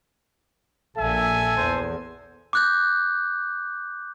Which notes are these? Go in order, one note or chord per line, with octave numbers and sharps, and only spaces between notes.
A#1 A#2 A4 E5 G#5
E2 C5
D6 F#6 G6